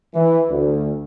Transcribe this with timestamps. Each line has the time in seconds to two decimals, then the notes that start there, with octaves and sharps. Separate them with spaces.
0.14 E3
0.50 D2